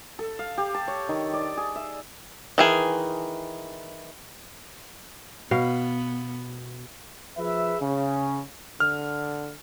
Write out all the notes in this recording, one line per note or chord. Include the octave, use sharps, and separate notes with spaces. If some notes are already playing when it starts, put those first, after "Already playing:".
A4
F5
G4
A5
C#5
D#3
D5
G#4
E5
D#3 E3 G#4
B2 B3 F5
F3 G#4 B4 E5
C#3
D3 F6